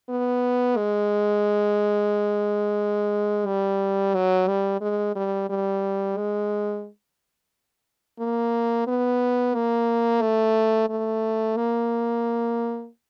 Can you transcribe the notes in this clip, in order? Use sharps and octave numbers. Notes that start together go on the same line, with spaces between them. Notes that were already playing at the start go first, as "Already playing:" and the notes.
B3
G#3
G3
F#3
G3
G#3
G3
G3
G#3
A#3
B3
A#3
A3
A3
A#3